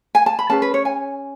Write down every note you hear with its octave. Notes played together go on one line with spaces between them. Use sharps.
G#5
A5
B5
C#4 G#4 B4 A5
B4
C#5
G#5